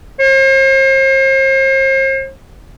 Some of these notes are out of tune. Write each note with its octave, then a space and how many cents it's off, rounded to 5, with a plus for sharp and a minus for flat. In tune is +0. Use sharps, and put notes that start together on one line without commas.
C5 +40